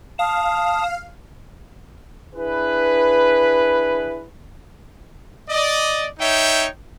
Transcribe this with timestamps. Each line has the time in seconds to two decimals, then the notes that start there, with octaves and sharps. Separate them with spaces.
0.19 F5 A5 D#6
2.35 D4 E4 G#4 B4
5.49 D5 D#5
6.19 D#4 C#5 E5 G5